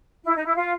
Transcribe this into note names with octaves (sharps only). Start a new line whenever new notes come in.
E4
D#4
E4
F4